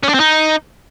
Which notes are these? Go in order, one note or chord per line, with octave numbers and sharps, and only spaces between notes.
C#4
D4
C4
D#4